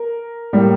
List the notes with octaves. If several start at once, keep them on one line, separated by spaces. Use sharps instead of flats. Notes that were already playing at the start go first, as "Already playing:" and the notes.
Already playing: A#4
A2 G3 A#3